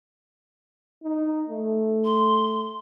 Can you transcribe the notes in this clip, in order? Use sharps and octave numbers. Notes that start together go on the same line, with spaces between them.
D#4
A3
C6